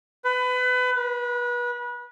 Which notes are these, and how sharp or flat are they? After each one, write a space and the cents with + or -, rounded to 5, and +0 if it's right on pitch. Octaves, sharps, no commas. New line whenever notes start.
B4 +25
B4 -30